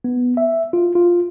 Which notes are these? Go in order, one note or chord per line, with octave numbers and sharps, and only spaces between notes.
B3
E5
F4
F4